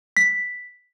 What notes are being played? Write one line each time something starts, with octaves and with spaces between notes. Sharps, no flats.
B6